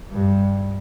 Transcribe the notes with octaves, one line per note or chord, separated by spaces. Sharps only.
G2